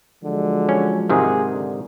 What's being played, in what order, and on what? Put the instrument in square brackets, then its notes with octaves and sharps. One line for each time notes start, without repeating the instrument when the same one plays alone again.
[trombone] D3 [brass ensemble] F3 F#3 G#3
[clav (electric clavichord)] C#4
[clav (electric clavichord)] G#2 C3 D#3 [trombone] G#4
[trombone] D3